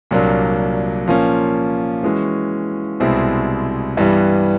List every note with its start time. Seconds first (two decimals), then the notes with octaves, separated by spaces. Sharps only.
0.11 C2 A#2 F#3 A#3 D4
1.07 A#2 F3 A#3 C#4
2.03 E3 G#3 C#4 F#4
3.00 C2 B2 G#3 C4 E4
3.97 G2 E3 G3 B3